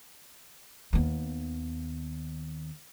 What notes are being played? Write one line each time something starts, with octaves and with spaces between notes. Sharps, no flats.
D#2 B3